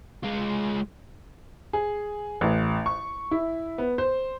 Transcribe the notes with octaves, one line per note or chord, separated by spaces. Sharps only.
G#3 F4
G#4
A1
C#6
E4
B3
C5